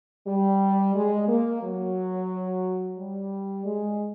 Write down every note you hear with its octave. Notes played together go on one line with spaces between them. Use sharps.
G3
G#3
A#3
F#3
G3
G#3